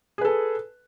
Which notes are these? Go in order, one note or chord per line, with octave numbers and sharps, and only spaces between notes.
G#4 A4 B4